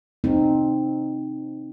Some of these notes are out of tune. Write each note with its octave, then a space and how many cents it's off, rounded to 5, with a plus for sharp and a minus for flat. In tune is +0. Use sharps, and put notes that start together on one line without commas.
C4 +0 D#4 -15